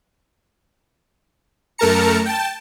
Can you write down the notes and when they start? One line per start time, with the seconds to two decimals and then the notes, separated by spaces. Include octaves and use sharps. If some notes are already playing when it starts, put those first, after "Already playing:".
1.78 F#2 A3 A#4 A5 A#5 C#7
2.26 G5 A5